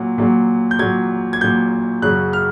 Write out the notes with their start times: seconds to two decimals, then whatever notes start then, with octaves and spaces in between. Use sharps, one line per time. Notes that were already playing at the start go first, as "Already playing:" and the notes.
Already playing: A#2 F#3
0.18 A#2 F#3
0.71 G6
0.79 A#2 F#3 G#6
1.33 G#6
1.41 A#2 F#3 G6
2.02 F#2 C#3 F#3 F#6
2.33 F6